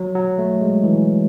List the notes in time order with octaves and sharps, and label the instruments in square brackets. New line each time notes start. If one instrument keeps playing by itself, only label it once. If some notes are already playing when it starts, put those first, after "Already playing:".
Already playing: [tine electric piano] F#3
F#3
A3
G#3
E3